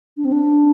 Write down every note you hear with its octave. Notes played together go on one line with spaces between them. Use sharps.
D4
C4
D4